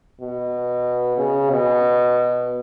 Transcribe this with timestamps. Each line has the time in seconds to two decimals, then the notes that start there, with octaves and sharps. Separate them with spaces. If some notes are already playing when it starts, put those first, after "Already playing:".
0.21 B2
1.18 C#3
1.50 B2